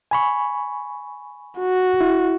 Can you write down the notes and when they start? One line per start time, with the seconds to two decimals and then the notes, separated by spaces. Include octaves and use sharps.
0.11 G#5 B5 C#6
1.60 F#4
2.01 E4